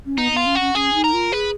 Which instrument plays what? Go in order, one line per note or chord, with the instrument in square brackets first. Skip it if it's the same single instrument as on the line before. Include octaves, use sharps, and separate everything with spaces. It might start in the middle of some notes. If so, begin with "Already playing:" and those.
[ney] C#4
[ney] B3 [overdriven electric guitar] D#4
[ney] B3 [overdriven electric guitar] F4
[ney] C#4
[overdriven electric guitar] F#4
[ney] C#4
[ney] C#4 [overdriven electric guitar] G#4
[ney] D#4
[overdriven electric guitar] A#4
[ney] F4
[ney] G#4 [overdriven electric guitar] B4